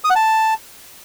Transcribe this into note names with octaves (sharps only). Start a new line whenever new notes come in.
D#6
F#5
A5